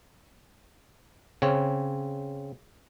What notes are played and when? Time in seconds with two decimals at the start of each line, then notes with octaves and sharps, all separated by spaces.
1.42 C#3 C4 C#5